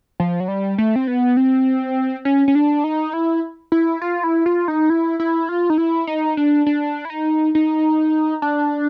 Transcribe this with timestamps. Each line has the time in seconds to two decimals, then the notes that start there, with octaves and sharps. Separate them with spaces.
0.20 F3
0.40 F#3
0.48 G3
0.78 A3
0.96 C4
1.07 B3
1.37 C4
2.25 C#4
2.48 C#4
2.55 D4
2.84 D#4
3.13 E4
3.72 E4
4.02 F4
4.24 E4
4.46 F4
4.68 D#4
4.90 E4
5.20 E4
5.49 F4
5.70 D#4
5.78 E4
6.07 D#4
6.37 D4
6.66 D4
7.05 E4
7.10 D#4
7.55 D#4
8.42 D4